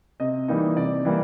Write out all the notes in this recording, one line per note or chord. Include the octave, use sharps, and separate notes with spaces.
C3 D#5
E3 G3 A#3 D#4
C3 D5
E3 G3 A#3